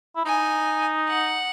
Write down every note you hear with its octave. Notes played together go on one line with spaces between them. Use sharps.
E4
D#4 G#5
F#5